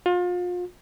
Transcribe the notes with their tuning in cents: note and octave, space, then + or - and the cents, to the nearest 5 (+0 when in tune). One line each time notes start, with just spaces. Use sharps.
F4 +35